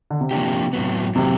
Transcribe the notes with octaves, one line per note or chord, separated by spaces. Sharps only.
D3
C3
F3 A#3 D4 G4
A2 F#3 B3
A2 C3 F#3 A#3